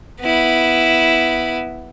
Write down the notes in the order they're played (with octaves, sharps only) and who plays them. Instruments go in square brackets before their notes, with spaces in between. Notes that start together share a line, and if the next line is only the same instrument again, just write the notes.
[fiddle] B3 E4